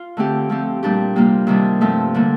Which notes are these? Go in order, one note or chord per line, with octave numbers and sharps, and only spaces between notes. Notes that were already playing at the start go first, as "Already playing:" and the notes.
Already playing: F4
D3 A3 C4 G4
F3 A3 C4 G4
A#2 G3 D4 G4
C3 G3 A#3 F4
C3 D#3 G3 D4
G2 F3 A3 C4
D3 G3 A#3 D4